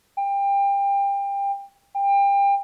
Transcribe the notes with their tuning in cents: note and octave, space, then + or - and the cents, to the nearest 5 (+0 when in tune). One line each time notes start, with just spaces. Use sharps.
G5 +25
G5 +30